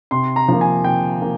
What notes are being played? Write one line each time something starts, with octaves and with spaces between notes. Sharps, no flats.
C3 C6
A#5
F3 A#3
G#5
C3 G5
A#3